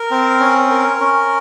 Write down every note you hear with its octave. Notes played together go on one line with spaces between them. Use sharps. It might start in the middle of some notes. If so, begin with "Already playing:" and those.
Already playing: A#4
C4
C#4
A#4
C#4